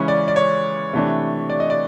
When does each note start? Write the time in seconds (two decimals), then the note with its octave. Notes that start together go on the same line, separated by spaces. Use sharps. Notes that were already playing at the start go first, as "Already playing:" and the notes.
Already playing: C#3 E3 G#3 C#4
0.08 D5
0.28 D5
0.36 C#5
0.93 C3 E3 A3 D4
1.50 D5
1.60 D#5
1.70 D5